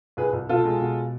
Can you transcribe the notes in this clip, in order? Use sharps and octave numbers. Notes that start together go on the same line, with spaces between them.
C2 G#4 B4
C2
B2 F4 A4
G#3
B2